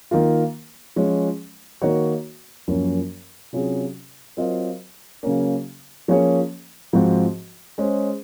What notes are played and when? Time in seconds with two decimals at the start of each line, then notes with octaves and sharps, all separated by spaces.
0.11 D#3 A#3 F4
0.96 F3 G#3 C#4
1.82 D#3 A#3 D#4 F#4 C#5
2.68 F#2 F3 A#3 C#4
3.53 C3 F#3 C#4 F4 G#4
4.37 F#3 C4 F4 A#4 D#5
5.23 C#3 F#3 A#3 C#4
6.08 F3 A#3 C#4 G#4 C#5
6.93 G#2 F3 C4 F#4
7.78 G#3 C#4 G#4 C5